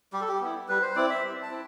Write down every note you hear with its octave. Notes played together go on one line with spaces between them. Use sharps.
G3 G4
A4
G4
B3 E4
G3 B4
C5
C4 E4 D5
E5
G3
A5
C4 E4